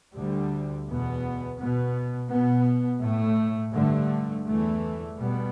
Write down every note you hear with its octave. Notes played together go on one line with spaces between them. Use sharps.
D2 D3 G3
E2 B2 B3
B2 B3
B2 B3
A2 A3
G2 D3 A3
E2 E3 A3
B2 G3 B3